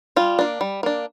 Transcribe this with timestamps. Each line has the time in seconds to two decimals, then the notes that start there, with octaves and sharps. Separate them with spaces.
0.16 G3 F4
0.39 A#3 D4
0.61 G3
0.83 A#3 D4